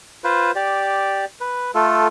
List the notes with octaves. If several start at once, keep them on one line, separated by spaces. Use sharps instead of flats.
F4 B4 C5
G4 D5
B4
A3 F4 A4